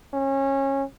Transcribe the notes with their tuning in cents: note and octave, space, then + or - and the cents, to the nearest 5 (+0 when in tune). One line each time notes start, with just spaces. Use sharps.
C#4 -25